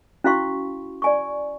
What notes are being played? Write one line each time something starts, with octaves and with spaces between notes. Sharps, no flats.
C#4 E4 F#4 F5 C6 C#6
D5 G#5 C#6